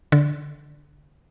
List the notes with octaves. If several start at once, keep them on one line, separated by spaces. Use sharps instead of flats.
D3